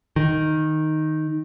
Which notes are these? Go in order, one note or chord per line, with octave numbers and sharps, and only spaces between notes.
D#3